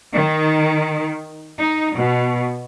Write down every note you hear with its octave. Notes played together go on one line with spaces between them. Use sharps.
D#3
D#4
B2